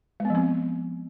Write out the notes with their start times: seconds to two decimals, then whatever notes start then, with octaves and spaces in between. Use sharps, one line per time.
0.20 G#3
0.25 B3
0.30 F3
0.35 C4